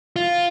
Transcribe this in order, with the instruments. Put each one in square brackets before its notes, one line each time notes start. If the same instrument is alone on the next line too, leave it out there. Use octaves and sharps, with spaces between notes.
[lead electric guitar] F4